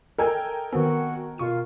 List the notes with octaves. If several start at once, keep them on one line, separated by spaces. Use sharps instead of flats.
A4 A#4 D#5 G5 G#5 E6 G#6
D#3 B3 C4 F#4
B2 F4 C#6 D#7